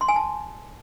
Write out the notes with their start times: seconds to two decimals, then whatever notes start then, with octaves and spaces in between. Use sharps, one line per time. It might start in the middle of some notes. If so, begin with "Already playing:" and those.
0.01 C6
0.08 G#5
0.16 A5